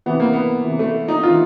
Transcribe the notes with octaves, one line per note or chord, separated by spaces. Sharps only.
C3 E3 B3
A#3
B3
C3 E3
A3
D#4
C3 E3 F4